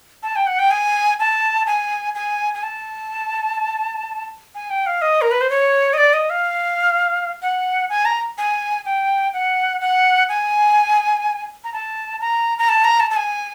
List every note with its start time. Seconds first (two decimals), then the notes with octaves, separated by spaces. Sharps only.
0.23 A5
0.36 G5
0.47 F#5
0.59 G5
0.71 G#5
1.20 A5
1.67 G#5
2.15 G#5
2.54 G#5
2.63 A5
4.55 G#5
4.70 G5
4.86 F5
5.02 D#5
5.22 A#4
5.31 B4
5.41 C5
5.50 C#5
5.93 D#5
5.98 D5
6.13 D#5
6.30 F5
7.42 F#5
7.90 G#5
8.05 A#5
8.38 G#5
8.86 G5
9.33 F#5
9.81 F#5
10.29 G#5
11.64 A#5
11.73 A5
12.21 A#5
12.58 A#5
12.69 A5
12.84 A#5
13.00 A5
13.11 A5
13.16 G#5